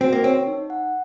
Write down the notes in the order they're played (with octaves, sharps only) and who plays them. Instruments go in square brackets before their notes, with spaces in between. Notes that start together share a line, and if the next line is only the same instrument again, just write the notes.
[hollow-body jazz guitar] C4 [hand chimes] F#4
[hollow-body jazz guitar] A#3
[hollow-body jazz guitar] C4 [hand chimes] C#5
[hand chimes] D#4
F#5